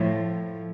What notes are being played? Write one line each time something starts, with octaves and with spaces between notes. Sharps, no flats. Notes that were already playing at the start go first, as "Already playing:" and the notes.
Already playing: A2 F3